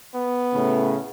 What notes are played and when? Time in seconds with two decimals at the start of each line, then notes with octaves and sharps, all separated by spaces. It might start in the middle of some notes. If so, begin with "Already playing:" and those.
0.14 B3
0.52 A2 C#3